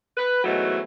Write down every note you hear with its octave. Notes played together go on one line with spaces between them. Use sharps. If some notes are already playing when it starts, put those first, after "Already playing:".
B4
G#2 B2 E3 F#3 A3